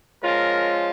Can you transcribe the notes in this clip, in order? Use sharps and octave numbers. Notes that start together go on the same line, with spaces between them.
F3 G#3 C#4 F4 A#4